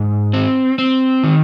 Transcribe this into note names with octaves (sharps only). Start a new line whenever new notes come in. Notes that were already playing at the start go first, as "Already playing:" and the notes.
Already playing: G#2
C4
C4
D#3